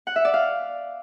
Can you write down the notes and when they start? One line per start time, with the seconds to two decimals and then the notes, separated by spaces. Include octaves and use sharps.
0.07 F#5
0.16 E5
0.25 D5
0.34 F5